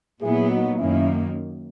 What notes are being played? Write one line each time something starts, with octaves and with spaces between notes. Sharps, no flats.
A#2 F#3 B3 E4 G#4
D#4 F#4
F#2 D#3 A#3 C#4 E4